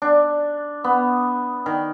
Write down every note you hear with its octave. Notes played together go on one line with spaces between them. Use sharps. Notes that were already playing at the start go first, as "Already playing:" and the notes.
D4
B3
D#3